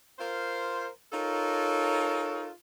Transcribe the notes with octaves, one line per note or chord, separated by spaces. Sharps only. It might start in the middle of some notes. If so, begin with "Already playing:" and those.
F4 A#4 C5
D#4 F4 A4 A#4 C#5